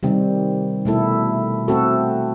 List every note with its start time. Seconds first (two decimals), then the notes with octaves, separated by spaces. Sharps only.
0.03 C3 D#3 G3 C4
0.85 B2 A3 E4 A4
1.68 A3 C4 F#4 A4